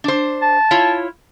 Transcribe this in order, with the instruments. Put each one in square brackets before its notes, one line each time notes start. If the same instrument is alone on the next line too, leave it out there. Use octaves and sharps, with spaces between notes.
[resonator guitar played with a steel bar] D4 C5
[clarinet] A5
[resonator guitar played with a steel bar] E4 F4 C#5